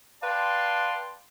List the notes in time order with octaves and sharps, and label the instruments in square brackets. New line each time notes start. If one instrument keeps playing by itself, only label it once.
[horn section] B4 D5 F5 G5 A5 C6